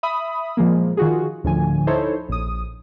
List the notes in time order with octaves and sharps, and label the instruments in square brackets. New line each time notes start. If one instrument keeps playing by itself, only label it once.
[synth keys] E5 B5 D#6
A#2 F3 G#3 A#3
D#3 F4 F#4 G#4
D2 A2 D3 F3 G#5
D#4 E4 A4 C5 C#5
A#1 D#6